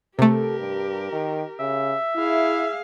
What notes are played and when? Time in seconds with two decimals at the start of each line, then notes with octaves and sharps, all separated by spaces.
0.19 C3 A3 G4 A4 A#4
0.60 G2
1.12 D#3
1.60 C#3 E5
2.16 E4 G#4 F5